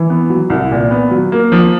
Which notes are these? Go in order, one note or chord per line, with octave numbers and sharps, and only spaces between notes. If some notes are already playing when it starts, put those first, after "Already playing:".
Already playing: E3
B3
F#3
C2
A#2
B3
F#3
A#3
F3